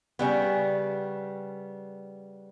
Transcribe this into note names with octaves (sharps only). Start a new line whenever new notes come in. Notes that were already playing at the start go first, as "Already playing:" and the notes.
C#3 G3 B3